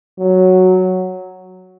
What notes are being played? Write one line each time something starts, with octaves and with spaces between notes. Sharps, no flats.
F#3